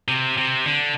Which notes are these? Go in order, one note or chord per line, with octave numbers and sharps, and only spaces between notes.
C3
C3
D3